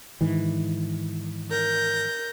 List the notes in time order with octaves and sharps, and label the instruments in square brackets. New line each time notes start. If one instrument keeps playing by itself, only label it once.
[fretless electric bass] G#2 D#3 E3
[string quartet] A#4 G6 A#6